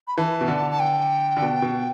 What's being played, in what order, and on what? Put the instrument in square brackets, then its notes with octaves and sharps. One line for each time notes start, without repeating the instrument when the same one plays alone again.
[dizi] B5
[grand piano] E3 [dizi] A5
[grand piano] B2
D3
[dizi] A5
G5
[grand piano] D3
B2
B2